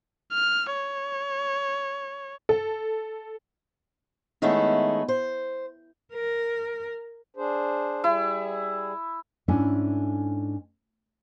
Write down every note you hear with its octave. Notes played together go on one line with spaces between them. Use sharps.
F6
C#5
A4
D#3 G#3 A3 B3 C#4 E4
C5
A#4
D4 G#4 C5
G3 E4 G#4
G#2 C#4 D4 E4 A4 E5